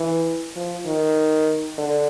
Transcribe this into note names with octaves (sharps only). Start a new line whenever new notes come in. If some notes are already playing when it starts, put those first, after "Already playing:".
Already playing: E3
F3
D#3
D3